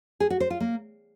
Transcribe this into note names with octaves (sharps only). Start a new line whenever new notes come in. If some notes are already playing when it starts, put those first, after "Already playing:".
G#4
F#4
C5
F4
A#3